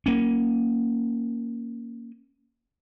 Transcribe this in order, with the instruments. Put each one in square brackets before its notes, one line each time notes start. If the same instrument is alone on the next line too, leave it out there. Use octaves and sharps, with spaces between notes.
[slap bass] A#3 C#4